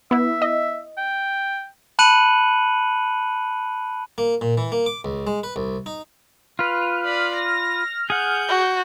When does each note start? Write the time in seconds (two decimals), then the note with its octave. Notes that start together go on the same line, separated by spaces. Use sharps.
0.11 B3 E4 E5
0.42 D#5
0.98 G5
1.99 A5 B5 F#6 C#7 D#7 F#7
4.18 A#3
4.41 A#2
4.58 E3
4.72 A#3
4.86 D6
5.05 C#2
5.27 G#3
5.43 B4
5.56 C2
5.86 D#4
6.59 F4 B4 F6
7.05 D5 B5
7.35 A#6
8.10 G#4 F#5 G6
8.49 F#4